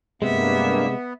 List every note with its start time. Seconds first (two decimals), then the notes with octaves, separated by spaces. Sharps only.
0.22 G2 C3 G#3 A#3 B3 E5